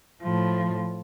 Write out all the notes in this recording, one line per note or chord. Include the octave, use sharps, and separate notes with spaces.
A2 F3